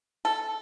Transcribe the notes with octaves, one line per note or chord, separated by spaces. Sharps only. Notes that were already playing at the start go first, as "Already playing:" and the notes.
A4